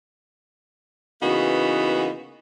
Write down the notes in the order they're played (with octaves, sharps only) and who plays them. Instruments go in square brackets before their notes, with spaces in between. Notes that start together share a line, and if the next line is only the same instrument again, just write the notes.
[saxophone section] C#3 E3 A#3 B3 D#4 F#4